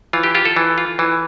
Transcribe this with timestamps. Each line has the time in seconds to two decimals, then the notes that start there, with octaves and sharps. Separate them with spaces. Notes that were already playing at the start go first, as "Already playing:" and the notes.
0.13 E3 F4
0.23 G4
0.35 F4 G4
0.45 A4
0.56 E3
0.78 F4
0.99 E3